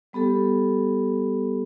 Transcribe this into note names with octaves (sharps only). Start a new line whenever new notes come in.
G3 B3 G4 A4